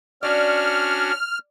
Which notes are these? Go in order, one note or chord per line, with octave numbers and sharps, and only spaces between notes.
C#4 D4 F#4 D5 F6